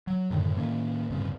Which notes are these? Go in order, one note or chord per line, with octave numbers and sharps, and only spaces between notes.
F#3
F#2 A2 D3 D#3
A2 D#3 A#3 C#4
D1 G2 C#3 C4